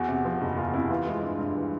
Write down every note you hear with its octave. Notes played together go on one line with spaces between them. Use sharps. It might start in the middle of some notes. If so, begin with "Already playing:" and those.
Already playing: E2 F#4
C3
F3
F#1
E2 F4
C3 E4
E3 F4
G#3
G2
G2
E3